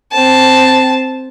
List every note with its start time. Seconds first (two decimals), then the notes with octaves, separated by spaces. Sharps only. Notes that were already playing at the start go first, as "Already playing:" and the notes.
0.12 C4 A5